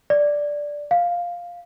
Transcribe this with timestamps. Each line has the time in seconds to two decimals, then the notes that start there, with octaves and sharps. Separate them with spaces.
0.10 D5
0.91 F5